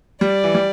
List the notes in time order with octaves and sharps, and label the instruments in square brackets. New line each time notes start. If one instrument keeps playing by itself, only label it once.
[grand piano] G3 [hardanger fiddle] D5
[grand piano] E3
G3